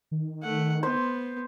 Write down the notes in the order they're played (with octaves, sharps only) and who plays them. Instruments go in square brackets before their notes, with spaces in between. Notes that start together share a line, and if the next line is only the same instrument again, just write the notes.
[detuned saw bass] D#3
[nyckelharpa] A3 F#5
[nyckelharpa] B3 [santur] C5